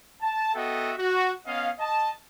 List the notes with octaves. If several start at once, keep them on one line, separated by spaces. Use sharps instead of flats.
A5
B3 F#4 A4 D#5 E5 G5
F#4
B3 C#4 D#5 F5
D#5 A5